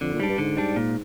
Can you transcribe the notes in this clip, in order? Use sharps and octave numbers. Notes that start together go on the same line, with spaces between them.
F2 D3
A#2
G#2 G3 D4
G2
G#2 D3
G3 D4
A#2